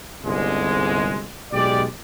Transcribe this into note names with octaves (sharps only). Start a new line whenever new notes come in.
G1 C2 C3 G#3
B1 G#3 G4 D5